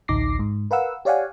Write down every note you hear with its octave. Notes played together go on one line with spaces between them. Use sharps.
A1 D2 D#4 D6 A#6 C7
G#2
A#4 B4 F5 F#5 E6
G4 C#5 D5 F5 F#5 G#5